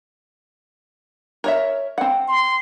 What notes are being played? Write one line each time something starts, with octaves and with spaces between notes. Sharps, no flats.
A#4 C#5 E5
C4 F#5
C6